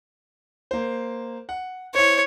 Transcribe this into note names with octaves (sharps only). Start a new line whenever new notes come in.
A#3 C5
F#5
E4 C5 C#5